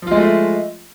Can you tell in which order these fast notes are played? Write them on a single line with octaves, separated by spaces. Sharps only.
F3 F4 G#3 A3 E4